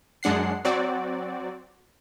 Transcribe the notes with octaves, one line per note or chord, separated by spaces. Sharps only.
F#2 G#3 D4 F#5 C7
F#3 C4 F#4 D5